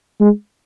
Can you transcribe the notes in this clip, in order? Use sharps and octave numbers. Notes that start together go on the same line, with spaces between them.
G#3